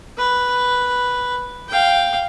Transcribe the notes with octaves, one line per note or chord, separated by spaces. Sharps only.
B4
F5 G5